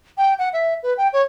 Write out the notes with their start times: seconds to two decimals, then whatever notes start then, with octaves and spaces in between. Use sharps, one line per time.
0.18 G5
0.39 F#5
0.53 E5
0.83 B4
0.97 G5
1.13 C#5